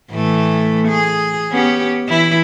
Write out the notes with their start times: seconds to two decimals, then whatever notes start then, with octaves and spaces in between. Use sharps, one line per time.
0.11 A2 E3 A3
0.88 G#4
1.51 B3 C#4 G4
2.07 E3 E4